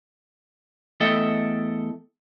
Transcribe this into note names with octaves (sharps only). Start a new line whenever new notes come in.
E2 A3 A4 D#5 E5 G5